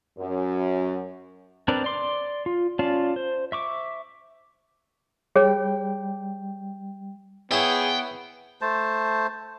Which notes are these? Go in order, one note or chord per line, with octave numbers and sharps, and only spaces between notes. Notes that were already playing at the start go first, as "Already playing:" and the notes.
F#2
C4 D4 A#4 B4 D5
D5 C6 D6
F4
C#4 F4 D5 F5 A5
C5
E5 C#6 D6
G3 G#4 C#5 G5
B3 E4 G#4 C5 C#5 G5
A3 C5 A5